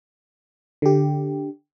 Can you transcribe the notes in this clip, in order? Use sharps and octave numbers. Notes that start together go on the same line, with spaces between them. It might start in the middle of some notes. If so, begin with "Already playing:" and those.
D3 G4